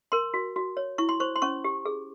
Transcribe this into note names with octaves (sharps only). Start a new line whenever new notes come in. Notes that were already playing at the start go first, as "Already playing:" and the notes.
A#4 C6
F#4
F#4
C#5
E4 C#6
C6
C5 C#6
C6
C#4 C#6
G4
G#4